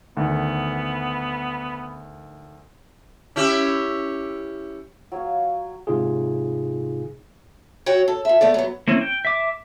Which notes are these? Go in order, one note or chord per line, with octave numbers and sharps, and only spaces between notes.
D2 D#3 B3
C#4 E4 G4
F#3 C#5 F5
G#2 C3 D#4 F4 G#4
F#4 C#5 G5
A4
F3 E5
A3 B3 D5
F#3 B3
A#3 C4 C#4 E4
G5
E5 D6